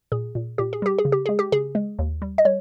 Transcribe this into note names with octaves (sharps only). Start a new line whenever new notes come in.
A#2 G#4
A#2
A#2 G4
G#4
G3 G4
G#4
C#3
G4
G#3 G#4
G4
C#3 G#4
G#3
D#2
G3
D#5
G3 C#5